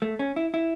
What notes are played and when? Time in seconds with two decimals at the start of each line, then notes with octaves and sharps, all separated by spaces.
0.02 A3
0.19 C#4
0.36 E4
0.54 E4